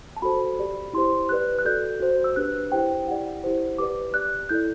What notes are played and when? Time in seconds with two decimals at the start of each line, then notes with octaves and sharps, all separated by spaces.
0.16 A5
0.22 F#4 A4 C5 B5
0.59 G4 D5
0.93 E4 G4 C5 C6
1.29 G4 B4 D5 F#6
1.59 F#6
1.65 F#4 A4 D5 G6
2.00 F#4 C5
2.24 E6
2.36 D4 G4 B4 F#6
2.72 E4 G4 C5 G5
3.07 E4 G4 D5 F#5
3.44 E4 G4 C5
3.78 G4 B4 D5 D6
4.14 G4 D5 F#6
4.49 E4 A4 D5 G6